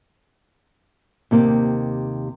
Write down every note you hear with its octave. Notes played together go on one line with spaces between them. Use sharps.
D#2 C3 A#3